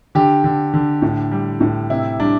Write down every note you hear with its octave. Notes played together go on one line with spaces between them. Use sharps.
D3 G4
D3
D3
A2
G3
A2
C3 E4
G3 D4